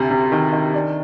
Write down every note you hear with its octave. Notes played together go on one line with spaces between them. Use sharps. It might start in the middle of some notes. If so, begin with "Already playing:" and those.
Already playing: D2 C3
C3
D#3
D#3
D4